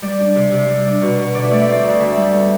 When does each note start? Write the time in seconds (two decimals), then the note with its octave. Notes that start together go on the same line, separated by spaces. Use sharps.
0.02 G3 D5
0.19 D4
0.35 C3
0.51 C3
0.68 G3
0.85 D4
1.02 B2
1.18 B2
1.34 D3 D5
1.44 E5
1.51 A3 D5
1.62 E5
1.67 C4 D5
1.84 D2
1.99 D3 E5
2.17 G3
2.33 B3